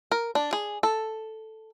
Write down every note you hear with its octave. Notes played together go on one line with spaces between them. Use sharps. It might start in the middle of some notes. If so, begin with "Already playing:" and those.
A#4
D4
G#4
A4